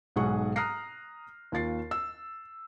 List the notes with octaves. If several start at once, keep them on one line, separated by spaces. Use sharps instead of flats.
B1 G#2 G#4 F#5 C#6
A#5 D#6 F6 F#6 A#6 C7
D#2 F4 A6 C7
E6